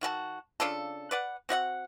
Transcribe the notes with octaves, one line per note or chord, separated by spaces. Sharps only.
D#3 F#4 G#4 A5
C#3 D4 F4 A4
B4 D5 F#5
C4 F#4 D#5 F#5